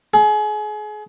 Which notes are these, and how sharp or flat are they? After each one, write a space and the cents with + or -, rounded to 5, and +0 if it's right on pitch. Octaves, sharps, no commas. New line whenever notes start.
G#4 +30